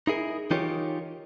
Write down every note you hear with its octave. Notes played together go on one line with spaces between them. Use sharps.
D#4 E4 G#4 A#4
E3 D#4 F4 G4 A#4 C#5